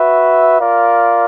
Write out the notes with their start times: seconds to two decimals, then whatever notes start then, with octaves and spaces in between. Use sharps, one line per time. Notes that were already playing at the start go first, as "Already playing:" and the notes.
Already playing: F#4 B4 E5
0.60 F4 A#4 D5 F5